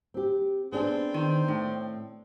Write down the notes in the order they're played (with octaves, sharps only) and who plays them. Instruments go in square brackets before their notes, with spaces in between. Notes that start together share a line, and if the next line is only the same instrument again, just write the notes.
[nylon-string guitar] C4 G4
[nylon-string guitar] B3 D4 G#4 [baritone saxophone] C4
[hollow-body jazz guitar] D#3
[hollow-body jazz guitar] A2 [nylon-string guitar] G5